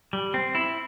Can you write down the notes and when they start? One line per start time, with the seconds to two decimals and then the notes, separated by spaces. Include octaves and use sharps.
0.13 G3
0.34 C4
0.55 E4